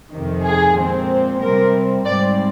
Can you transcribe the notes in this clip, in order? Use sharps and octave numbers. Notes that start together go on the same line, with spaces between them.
F2 C3 D#3
G#4
A#2 G#3 C4
C3 G3 C4 A#4
G#2 G3 C4 D5